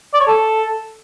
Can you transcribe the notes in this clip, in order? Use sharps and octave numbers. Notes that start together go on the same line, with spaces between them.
D5
C#5
A4